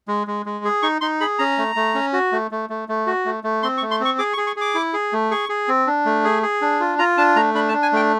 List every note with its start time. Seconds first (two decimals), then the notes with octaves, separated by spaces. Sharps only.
0.08 G#3
0.27 G#3
0.46 G#3
0.65 G#4
0.82 D#4 C#6
1.01 D#4 C6
1.21 G#4 B5
1.39 C#4 A#5
1.58 A3
1.76 A3
1.95 C#4
2.13 F#4
2.32 A3
2.51 A3
2.70 A3
2.89 A3
3.07 F#4
3.25 A3
3.44 A3
3.63 C4 C6
3.77 C#6
3.82 A3
3.91 C6
4.00 C4 C#6
4.19 G#4 D6
4.33 C#6
4.37 G#4
4.47 C#6
4.56 G#4 D6
4.75 E4
4.93 G#4
5.13 A3
5.31 G#4 C#6
5.49 G#4
5.68 C4
5.87 D4
6.05 A3
6.24 G#4
6.43 G#4
6.61 D4
6.80 F4
6.99 F4 A#5
7.17 D4 A5
7.36 A3 A#5
7.54 D4 B5
7.69 A5
7.74 D4
7.82 G#5
7.93 A3 G5